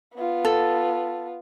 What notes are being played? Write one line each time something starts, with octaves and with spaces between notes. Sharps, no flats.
B3 F4
A4